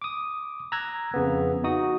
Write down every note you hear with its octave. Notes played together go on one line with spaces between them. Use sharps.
D6 D#6
A#5 E6 F#6 G#6 A#6
F2 C#3 B3
D#4 F#4 D#6